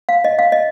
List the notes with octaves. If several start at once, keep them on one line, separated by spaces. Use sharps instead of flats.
F5
D#5
F5
D#5